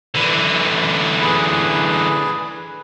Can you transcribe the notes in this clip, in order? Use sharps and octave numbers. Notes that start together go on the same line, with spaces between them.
D3 E3
G#4 B4